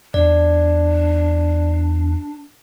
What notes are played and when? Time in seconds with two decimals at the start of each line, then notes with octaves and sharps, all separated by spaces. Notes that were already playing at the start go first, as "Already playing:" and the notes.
0.14 E2 D4 D5